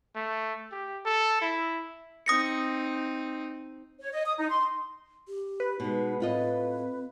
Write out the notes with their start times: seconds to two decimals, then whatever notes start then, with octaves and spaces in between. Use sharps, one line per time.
0.15 A3
0.72 G4
1.05 A4
1.41 E4
2.26 C4 D#4 D#6 A#6 C#7
3.99 C#5
4.12 D#5
4.26 D#6
4.38 D#4
4.50 C6
5.28 G4
5.60 B4
5.80 B2 G#3 D#4
6.20 A2 C4 F4 D#5